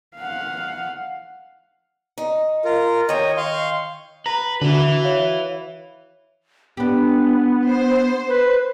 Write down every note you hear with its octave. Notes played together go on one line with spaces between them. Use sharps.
F5 F#5
D#4
F4 A#4
D#3 C#5 D#5 G5
F5 C6 C#6
B4 A#5
D3 E4 F#4 B4
C#5 F5
B3 D4 G4
C5
B4